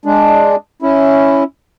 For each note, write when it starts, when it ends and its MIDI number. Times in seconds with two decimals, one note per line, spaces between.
0.05 0.56 56
0.05 0.56 62
0.82 1.44 61
0.82 1.44 64